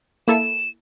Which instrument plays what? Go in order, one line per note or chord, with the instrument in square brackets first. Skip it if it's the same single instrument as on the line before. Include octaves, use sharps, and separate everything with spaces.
[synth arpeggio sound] A#3 E4 A4 [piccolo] E7